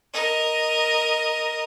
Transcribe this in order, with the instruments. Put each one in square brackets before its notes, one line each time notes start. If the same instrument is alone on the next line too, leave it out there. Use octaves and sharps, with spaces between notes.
[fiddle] A#4 D#5